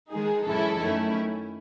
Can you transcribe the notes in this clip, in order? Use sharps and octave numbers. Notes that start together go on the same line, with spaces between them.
D#3 G#3 D#4 G#4
F#2 E3 G#3 C#4 E4 A4
D#3 A3 C#4 E4